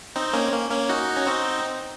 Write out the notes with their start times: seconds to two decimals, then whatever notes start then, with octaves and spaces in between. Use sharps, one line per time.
0.16 C4 D#4
0.33 A#3 C#4
0.53 A#3
0.71 A#3 C#4
0.89 D#4 F#4
1.17 C#4
1.27 C4 D#4